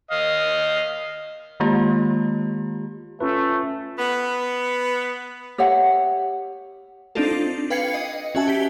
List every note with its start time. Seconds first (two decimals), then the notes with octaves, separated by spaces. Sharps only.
0.11 D#5 F5
1.60 D#3 G#3 A#3 F4 G4
3.20 A3 C#4 F4 B4
3.98 B3
5.58 G4 C#5 E5 F#5
7.15 C4 D4 D#4 F4 A4
7.31 D4
7.70 B4 F5 G5 G#6 C7 C#7
7.94 D#5
8.35 C#4 F#4 E5 G#5 A5
8.48 G4 B6